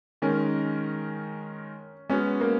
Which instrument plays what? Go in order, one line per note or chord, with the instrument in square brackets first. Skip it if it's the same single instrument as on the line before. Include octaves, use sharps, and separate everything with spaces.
[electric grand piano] D#3 G#3 D#4 A#4 [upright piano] C#4
[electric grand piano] G#3 B3 F#4 [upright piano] C#4
[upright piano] A#3